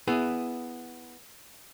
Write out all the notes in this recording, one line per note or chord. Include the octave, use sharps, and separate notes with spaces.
B3 E4 G#4